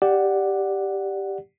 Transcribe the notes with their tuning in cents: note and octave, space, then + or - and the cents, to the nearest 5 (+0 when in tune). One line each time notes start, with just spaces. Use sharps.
G4 +0 D5 +0 F#5 +0